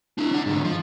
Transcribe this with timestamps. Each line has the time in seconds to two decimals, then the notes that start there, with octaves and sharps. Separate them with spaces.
0.18 D4 E4
0.32 D4 F#5
0.46 G#2 D3
0.65 F3